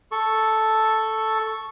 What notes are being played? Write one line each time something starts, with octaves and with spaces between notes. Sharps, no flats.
A4 C#6